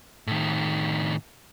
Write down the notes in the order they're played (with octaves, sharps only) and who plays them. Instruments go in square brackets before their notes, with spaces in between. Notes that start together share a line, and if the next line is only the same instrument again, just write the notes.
[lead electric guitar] A2 D#3